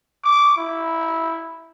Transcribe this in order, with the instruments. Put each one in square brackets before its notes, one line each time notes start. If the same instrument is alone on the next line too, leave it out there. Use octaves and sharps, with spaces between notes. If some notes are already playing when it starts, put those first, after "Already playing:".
[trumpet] D6
E4